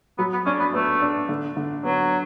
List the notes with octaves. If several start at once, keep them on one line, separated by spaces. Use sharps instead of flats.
F#3 B3
B3
C#4 D4
B3
A3 B3
D4
D3
D3
F#3 B3